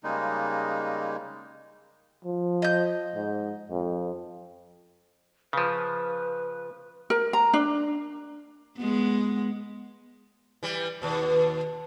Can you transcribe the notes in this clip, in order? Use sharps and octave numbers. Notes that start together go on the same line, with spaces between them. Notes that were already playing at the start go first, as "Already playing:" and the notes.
C#3 G3 G#3 A#3 D#4
F3
D#5 G6
G#2
F2
C#3 F3 B4
A#4
A#5
D4
G#3 B3
E3 G3
D#2 B2